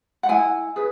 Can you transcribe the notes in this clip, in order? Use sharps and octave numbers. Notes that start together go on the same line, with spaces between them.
F#5
E4 G#5
G#4 B4